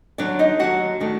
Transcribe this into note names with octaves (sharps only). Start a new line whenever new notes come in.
D#2 D3 F#3 D4 D5
D#4 D#5
D#2 D3 F#3 F#4 F#5
D#3 A3 D4